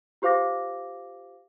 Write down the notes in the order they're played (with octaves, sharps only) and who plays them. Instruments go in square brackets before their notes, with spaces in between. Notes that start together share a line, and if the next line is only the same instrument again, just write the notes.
[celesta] F4 G4 C5 F5 D6 A#6